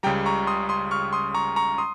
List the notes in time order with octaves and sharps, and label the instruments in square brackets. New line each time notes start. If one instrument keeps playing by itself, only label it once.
[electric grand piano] C#2 C#3 G3 G5 A#5
A#5 C#6
C6 D#6
C6 D#6
C#6 F6
C6 D#6
A#5 C#6
A#5 C#6
C6 D#6